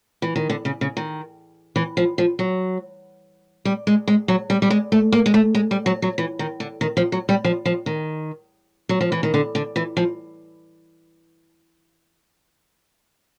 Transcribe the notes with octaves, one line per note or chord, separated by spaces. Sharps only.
E3
D#3
D3
C#3
C#3
D#3
E3
F3
F3
F#3
G3
G#3
G#3
F#3
G3
G3
G#3
A3
A#3
G#3
A3
G#3
G3
F#3
F#3
E3
D#3
D3
D#3
F3
F#3
G3
F3
F3
D#3
F#3
F3
E3
D#3
D3
D3
E3
F3